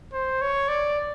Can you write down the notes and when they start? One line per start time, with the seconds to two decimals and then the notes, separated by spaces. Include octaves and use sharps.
0.13 C5
0.41 C#5
0.69 D5